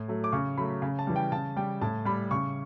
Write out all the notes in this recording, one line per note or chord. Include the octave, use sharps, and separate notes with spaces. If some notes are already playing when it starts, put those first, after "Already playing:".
Already playing: A2
F#3 A3
D6
C#3 C#6
F#3 A3 B5
C#3
A5
E3 G3
G5
C#3 A5
G3 G5
A2 A5
G3 B5
C#3 C#6